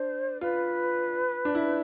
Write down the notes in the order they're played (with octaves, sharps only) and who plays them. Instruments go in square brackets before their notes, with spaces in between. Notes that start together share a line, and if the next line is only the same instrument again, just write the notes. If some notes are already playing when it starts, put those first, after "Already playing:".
Already playing: [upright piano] D4 [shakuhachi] C5
[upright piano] F4 [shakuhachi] B4
[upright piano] D4
E4